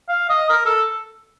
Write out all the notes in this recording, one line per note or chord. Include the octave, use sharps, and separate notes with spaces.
F5
D#5
A#4
A4